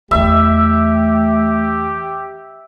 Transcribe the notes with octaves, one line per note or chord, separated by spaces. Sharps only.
E2 E3 A3 G4 E5